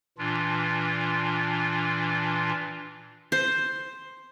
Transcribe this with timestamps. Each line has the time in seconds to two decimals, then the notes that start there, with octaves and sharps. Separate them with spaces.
0.18 A#2 E3 D4 F4
3.32 C5